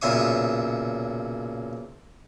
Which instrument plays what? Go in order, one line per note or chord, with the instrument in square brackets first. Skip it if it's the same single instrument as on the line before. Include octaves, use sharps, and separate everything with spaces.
[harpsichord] B1 A#2 C#3 E5 C#6 D#6